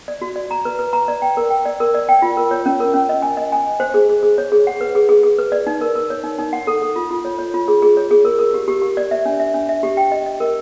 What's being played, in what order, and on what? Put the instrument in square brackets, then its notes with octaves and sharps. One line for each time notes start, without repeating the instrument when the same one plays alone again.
[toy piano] D5
F#4
D5
A#5
B4
B4
A#5
D5
G5
A#4
G5
D5
A#4
D5
G5
F4
A#4
C#5
C#4
A#4
C#4
D#5
G#5
D#5
G#5
G#5
C5
G#4
G#4
G#4
C#5
G#4
F#5
B4
G#4
G#4
G#4
B4
D5
D#4
A#4
A#4
C#5
D#4
D#4
F#5
A4
A4
F4
F4
C#5
C#5
F4
G#4
G#4
C#5
G#4
A#4
A#4
G4
G4
G4
D5
E5
D4
E5
D4
E5
G4
G5
D#5
D#5
A#4